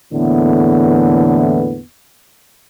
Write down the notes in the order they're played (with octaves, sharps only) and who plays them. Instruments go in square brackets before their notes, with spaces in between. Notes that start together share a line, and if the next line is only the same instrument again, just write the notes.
[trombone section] E2 A2 D3 E3 A#3 B3